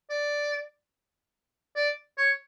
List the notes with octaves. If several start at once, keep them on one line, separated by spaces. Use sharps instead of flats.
D5
D5
C#5